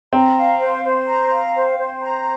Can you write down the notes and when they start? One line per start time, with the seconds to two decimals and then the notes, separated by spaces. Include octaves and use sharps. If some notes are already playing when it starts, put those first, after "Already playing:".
0.13 C4 A#5
0.36 F5
0.60 C5
0.84 C5
1.07 A#5
1.31 F5
1.55 C5
1.78 C5
2.02 A#5